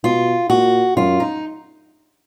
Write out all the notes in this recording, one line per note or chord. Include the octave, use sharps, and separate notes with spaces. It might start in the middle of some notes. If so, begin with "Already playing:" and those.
B2 F4
A#2 F#4
F#2 F4
D#4